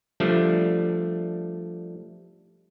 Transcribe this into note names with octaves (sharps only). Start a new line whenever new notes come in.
F3 G3 A3 D4